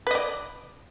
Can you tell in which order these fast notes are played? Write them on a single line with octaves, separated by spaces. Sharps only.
B4 D#5 D5